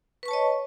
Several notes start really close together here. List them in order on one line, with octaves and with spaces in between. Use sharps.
B4 C#6 A5 C#5 D#5